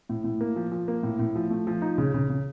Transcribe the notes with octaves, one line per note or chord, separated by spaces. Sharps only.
A2
A2
A#3
F3
F3
A#3
A2
A2
F3
A3
F3
D#4
C#3
C#3
C#3